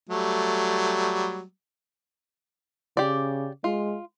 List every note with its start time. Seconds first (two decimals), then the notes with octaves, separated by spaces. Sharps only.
0.09 F#3 G3 A3
2.97 C#3 G4 D5
3.64 G#3 F4